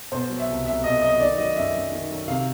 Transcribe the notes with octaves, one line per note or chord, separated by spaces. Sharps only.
B2 C5
F#3
E5
C2
C2 E5
B2 D#5
F#3 D#5
D#3 D5
F#3 D#5
F#2 E5
F#2
D#3
F#3
C3 F5